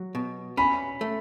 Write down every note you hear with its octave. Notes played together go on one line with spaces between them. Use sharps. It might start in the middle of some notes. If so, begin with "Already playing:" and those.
Already playing: F#3
B2
C#4 B5
A3